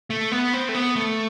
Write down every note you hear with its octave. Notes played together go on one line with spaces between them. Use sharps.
A3
B3
C4
A3
B3
A3